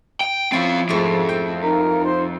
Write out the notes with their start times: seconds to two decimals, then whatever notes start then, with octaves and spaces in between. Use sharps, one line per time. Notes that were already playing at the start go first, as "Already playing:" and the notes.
0.21 G5
0.52 F3 C4 C#4 E4 F5 A5
0.89 F2 G#2 A3
1.29 G5
1.64 D#4 A#4
2.04 C5